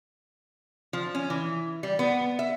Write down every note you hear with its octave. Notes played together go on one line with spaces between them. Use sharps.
F3
C#4
E3
G3
B3
E5